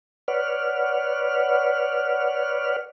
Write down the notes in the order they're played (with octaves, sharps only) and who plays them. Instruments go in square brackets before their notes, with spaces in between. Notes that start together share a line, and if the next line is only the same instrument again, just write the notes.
[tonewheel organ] B4 C#5 D5 F#5 F6